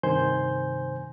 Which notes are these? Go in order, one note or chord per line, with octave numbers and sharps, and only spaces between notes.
G2 C3 D#3 C5 G#5 G6